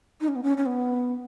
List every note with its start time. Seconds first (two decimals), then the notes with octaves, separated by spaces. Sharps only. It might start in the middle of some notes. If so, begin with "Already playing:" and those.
0.21 D#4
0.28 C#4
0.36 B3
0.43 C#4
0.57 C#4
0.66 B3